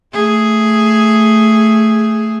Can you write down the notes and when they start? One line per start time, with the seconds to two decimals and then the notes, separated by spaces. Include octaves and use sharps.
0.13 A3 G#4